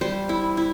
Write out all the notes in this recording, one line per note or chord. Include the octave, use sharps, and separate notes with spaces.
G3 C5
E4
E4